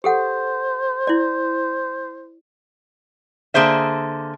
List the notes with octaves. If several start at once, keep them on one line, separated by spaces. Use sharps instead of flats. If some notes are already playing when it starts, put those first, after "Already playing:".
G4 A4 C5 F#5
E4 D5
D3 A#3 G#4 C5 E5